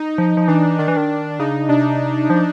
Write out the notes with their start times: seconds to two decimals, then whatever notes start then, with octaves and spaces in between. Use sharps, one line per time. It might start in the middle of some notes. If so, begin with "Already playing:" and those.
Already playing: D#4
0.18 F3
0.37 F3
0.48 E3 D4
0.79 D#3 D4
0.88 E3
0.97 D#3
1.39 C#3 D#4
1.69 C3 D4
2.30 F3